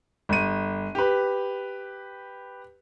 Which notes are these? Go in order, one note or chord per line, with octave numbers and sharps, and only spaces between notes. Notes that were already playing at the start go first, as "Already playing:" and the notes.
G1 D#7
G4 B4